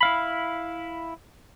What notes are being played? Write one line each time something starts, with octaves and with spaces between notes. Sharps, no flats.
E4 F5 B5